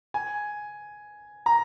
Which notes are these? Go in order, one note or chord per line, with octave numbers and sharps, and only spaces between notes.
G#5
A#5